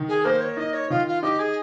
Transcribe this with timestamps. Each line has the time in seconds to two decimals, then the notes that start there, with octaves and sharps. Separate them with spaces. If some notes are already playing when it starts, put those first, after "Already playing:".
Already playing: D#3
0.08 G#4
0.25 A#3 C5
0.40 C#5
0.57 D#4 D#5
0.73 C#5
0.90 D#3 F4
1.07 F4
1.22 D#4 G4
1.39 G#4